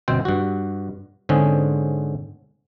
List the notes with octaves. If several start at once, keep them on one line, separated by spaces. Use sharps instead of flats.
G1 B2 C4 C5 G5
G2 F#4
G#2 D3 C4 C#4 G#4